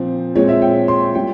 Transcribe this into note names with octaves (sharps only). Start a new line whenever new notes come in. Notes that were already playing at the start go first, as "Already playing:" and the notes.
Already playing: A#2 F3 C4
A#2 G#3 C4 C#5
E5
G5
C6
A#2 G3 G5